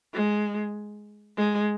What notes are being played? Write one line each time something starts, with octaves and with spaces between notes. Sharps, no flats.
G#3
G#3